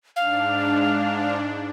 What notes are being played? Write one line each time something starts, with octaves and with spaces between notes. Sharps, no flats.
G#2 D4 F5